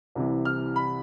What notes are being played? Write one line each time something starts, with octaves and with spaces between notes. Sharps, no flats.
C2 C3 E3
F6
B5